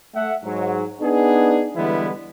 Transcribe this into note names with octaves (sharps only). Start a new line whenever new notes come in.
A3 E5 F#5
G#2 F#3
B3 D4 D#4 G#4
D3 E3 G3 G#3 B3 E4